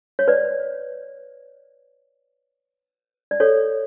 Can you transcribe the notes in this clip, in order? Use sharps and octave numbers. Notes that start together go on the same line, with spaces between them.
C#5
B4 D5
D5
A4 C#5